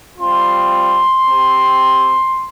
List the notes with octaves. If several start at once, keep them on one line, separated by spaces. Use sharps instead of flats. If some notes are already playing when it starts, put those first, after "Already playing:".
G3 C4 F4 C6
C4 G4